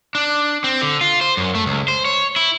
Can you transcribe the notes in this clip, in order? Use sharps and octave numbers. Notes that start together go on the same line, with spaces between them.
D4
C4
D3
F4
C5
F#2
A3
C#2
C5
C#5
E4